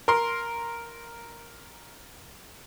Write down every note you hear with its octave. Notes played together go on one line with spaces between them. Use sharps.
A#4 C6